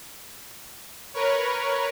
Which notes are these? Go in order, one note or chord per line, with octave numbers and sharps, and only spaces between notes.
A#4 B4 C#5